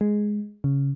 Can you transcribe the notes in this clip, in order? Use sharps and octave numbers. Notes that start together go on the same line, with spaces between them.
G#3
C#3